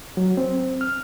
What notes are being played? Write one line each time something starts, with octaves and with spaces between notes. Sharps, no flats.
F#3
C4
F6